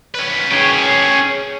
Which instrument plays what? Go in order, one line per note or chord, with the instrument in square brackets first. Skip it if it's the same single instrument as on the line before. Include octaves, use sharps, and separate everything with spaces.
[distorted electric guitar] C#4 B4
[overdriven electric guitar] G#4 G5 [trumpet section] C#5